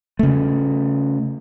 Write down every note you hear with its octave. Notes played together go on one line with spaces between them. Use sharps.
C#3 A3